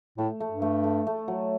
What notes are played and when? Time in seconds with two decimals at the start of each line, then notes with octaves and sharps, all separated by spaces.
0.18 A2 A3
0.40 A3
0.51 G2
0.62 A3
0.84 A3
1.07 A3
1.28 F#3